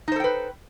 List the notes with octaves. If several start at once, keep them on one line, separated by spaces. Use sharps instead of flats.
D#4 A4 B4 C5 G5